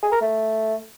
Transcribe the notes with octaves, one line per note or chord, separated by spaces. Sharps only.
G#4
A#4
A3